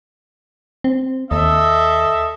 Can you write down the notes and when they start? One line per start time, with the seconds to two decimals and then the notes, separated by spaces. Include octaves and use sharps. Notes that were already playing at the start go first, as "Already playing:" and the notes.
0.84 C4
1.31 D#2 A4 D#5 E5